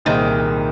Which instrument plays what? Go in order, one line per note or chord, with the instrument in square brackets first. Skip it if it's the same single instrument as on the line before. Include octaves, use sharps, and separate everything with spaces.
[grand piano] C2 A#2 A#3 G#4 C5 [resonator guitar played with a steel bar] D#3